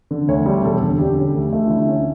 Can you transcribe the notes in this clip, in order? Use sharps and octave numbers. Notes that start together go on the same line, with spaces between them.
D3
D2 C#5
G3
E1 A4
D3
D3 G4
C#4
D2
A3
F4
D3 E4
C#4